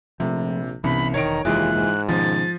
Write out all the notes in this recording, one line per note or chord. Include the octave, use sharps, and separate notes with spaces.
A#1 C3 F3 A3
C2 G2 E3 B3 C#4 B5
E1 D#3 C#5 A#5 D7
F1 D#2 E3 G#3 A#3 F4 F#6
G#2
B2 D#3 F3 C#4 A6